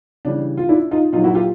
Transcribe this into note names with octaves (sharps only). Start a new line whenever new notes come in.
C#3 E3 G3 D4
F4
D4 E4
D#4 F4
A#2 F#3 D#4 F4
E4 F#4
F4 G4